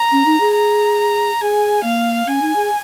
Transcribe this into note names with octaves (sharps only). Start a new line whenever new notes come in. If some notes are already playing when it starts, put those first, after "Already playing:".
Already playing: A#5
C#4
D#4
G#4
A#5
G#4 G#5
A#3 F5
C#4 G#5
D#4
G#4